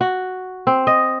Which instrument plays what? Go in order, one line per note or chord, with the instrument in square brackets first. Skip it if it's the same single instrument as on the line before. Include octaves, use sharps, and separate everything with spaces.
[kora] F#4
C4
D#5